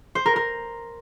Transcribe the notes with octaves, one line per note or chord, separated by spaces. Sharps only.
C5
A#4
A#4